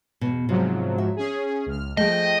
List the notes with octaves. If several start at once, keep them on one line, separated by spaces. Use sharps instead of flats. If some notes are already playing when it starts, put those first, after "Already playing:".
E2 B2
G#2 C3 F3 F#3
E5
C#4 G#4
C#2 F6
F3 A3 G#4 D#5 G5